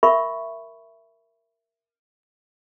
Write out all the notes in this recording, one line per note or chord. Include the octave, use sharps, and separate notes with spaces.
A#4 E5 B5 C#6